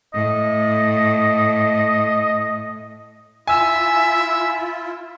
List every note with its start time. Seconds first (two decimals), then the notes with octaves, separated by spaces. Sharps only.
0.14 A2 D#5
3.47 E4 F4 E5 G#5 E6